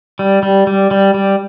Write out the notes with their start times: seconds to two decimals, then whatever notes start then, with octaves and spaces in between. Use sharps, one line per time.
0.19 G3
0.43 G3
0.67 G3
0.91 G3
1.14 G3